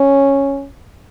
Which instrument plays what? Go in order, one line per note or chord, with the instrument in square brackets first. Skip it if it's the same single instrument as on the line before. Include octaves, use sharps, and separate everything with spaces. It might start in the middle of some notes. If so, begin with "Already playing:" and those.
Already playing: [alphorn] C#4